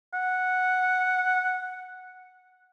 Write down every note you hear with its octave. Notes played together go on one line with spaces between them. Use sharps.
F#5